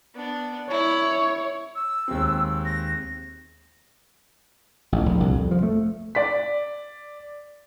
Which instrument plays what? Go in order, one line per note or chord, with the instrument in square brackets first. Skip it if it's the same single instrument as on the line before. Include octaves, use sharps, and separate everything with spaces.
[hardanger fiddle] B3 D4
[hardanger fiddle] E4 [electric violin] C#5
[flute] E6
[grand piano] D#2 G#3 C4
[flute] A#6
[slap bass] A1
A#1
C2
F2
F3
A3
[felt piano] D5 B6